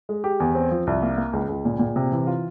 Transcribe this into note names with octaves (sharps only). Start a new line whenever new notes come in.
G#3
G4
E2
C4
F3
C2
A#3
A#3
C#2
C#2
A#2
A#2
C3
E3
F4